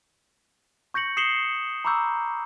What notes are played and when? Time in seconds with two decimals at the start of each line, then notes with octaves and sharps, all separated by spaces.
0.94 C#6 G6 A#6 C#7 F#7
1.17 D#6 C7 C#7 E7 F#7 G7
1.85 A#5 B5 C#6 D6 E6 G6